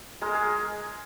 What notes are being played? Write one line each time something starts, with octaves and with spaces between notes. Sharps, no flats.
G#3 A#4
G#4